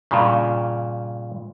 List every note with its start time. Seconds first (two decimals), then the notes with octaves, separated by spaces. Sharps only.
0.11 G2 A#2 C#3